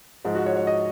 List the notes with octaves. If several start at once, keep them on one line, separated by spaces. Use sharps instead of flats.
G#2 F3 G#3
F#4
C#5
C#5
D#5